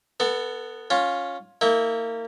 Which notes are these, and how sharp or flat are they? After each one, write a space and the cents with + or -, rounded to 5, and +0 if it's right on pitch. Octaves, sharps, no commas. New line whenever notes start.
B3 +0 A4 +30
C#4 +0 F4 +15
A#3 -30 E4 -25